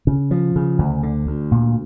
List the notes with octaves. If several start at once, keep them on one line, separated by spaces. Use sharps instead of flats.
C#3
F3
C#3
D2
D3
D2
A#2